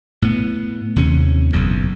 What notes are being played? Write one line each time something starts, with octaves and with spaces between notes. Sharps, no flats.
A2 B3
D#2 C3 C#4
F#1 B1 E2